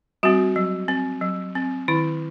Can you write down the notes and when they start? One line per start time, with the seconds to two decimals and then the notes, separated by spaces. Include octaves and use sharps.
0.23 G3 C4 F#4
0.56 F#3
0.88 C4
1.21 F#3
1.55 C4
1.88 D#3 E4